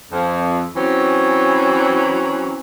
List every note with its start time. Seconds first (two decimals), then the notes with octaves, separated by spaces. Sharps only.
0.12 F2
0.76 E3 F#3 C4 C#4